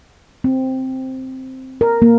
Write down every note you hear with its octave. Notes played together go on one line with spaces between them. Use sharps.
C4
A#4
A#3